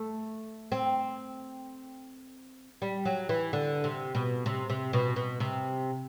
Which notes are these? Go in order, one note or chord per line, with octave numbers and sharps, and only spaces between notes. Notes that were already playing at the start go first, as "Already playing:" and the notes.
Already playing: A3
C4
G3
F#3
E3
D3
C3
B2
C3
C3
B2
B2
C3